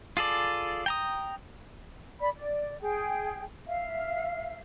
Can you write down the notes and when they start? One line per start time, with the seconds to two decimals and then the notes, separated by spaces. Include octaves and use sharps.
0.17 F4 G#4 A4 D5
0.86 G5 A#5 D#6
2.20 D5 B5
2.36 D5
2.81 G#4 G5
3.67 E5 F5